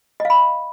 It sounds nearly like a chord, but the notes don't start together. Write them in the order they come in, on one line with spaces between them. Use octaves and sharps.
D#5 F5 B5